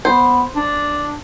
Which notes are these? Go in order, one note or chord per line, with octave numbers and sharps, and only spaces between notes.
B3 C5
D4